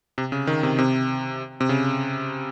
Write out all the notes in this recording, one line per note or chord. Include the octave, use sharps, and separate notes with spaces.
C3
C#3
D#3
C3
C3
C3
C#3